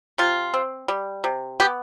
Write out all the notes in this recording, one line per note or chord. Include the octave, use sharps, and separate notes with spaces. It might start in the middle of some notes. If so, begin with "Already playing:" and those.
C3 F4
C4
G3
C3
B3 G4